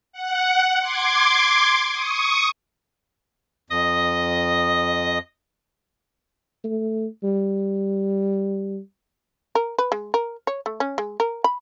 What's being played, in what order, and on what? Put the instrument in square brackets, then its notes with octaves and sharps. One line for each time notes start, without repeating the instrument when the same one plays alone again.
[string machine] F#5
C6 D6 G#6
C#6 D#6
[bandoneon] F2 [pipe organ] D#5 D#6
[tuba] A3
G3
[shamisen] A#4
B4
G#3
A#4
C#5
A3
C#4
G#3
A#4
B5